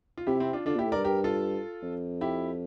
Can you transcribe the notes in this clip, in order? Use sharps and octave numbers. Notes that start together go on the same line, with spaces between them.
F4
C3 E4 G4
C4 E4
D4 F4
D3 D4 F4
A#2
E4 G4
A2
G2 A#4 D5
G2 G4 A#4
F4 A4
F2
E4 G4